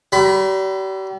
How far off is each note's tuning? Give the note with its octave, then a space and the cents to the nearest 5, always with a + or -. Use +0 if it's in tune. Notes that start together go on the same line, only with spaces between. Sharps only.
G3 -40 B5 +25